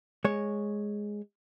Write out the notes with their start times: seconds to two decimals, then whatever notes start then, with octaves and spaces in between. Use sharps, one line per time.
0.24 G#3 C#5